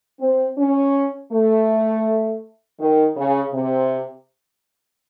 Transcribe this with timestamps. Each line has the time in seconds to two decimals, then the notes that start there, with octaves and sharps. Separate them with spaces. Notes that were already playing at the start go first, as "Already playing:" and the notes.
0.21 C4
0.58 C#4
1.32 A3
2.80 D#3
3.17 C#3
3.53 C3